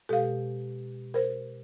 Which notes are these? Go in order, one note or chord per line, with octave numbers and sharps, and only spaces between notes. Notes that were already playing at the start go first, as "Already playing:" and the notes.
B2 G#3 G4 A4 F5
A#4 C5